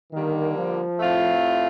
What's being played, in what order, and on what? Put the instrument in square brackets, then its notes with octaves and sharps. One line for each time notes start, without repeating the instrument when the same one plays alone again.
[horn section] D3 G3 A#3 [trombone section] D#3
[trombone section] F3
[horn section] A2 A3 C4 F4